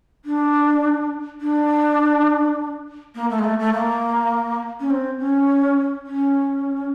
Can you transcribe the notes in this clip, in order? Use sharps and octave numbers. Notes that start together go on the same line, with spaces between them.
D4
D4
A#3
A3
G#3
A3
A3
A#3
C#4
C4
C#4
C#4